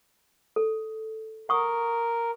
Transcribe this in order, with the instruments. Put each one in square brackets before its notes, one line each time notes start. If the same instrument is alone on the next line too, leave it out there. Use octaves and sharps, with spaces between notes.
[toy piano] A4
[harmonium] A#4 [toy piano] F#5 C#6 D#6